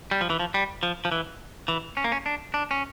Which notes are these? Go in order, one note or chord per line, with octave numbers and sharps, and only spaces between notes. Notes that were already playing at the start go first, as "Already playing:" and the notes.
G3
F3
E3
F3
G3
F3
F3
E3
E3
C#4
A#3
C#4
D4
D4
C#4